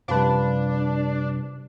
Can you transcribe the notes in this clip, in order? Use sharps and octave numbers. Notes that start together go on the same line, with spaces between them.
F#2 C3 F3 G3 D4 B4